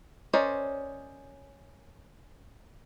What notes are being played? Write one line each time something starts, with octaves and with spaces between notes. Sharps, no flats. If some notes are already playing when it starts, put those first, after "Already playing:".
C#4 A#4 C5 D5 D#5